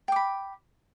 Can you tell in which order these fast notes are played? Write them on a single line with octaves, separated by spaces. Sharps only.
G5 D6 B5